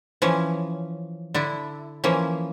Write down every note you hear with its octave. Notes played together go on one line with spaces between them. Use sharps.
E3 F3 C#4
D3 D4 E4
E3 F3 A#3 C#4